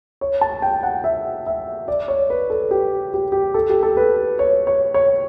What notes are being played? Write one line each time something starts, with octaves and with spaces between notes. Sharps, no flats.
C#5
A5
G5
F#5
E5
E5
D5
C#5
B4
A4
G4
G4
G4
A4
G4
A4
B4
C#5
C#5
C#5